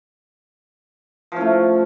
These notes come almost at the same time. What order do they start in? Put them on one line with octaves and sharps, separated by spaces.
F3 C#4 A3